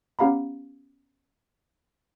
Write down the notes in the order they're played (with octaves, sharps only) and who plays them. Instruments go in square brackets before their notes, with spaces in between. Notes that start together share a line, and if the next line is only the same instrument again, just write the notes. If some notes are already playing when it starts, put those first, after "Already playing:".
[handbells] B3 C#4 G4 F5 A#5 B5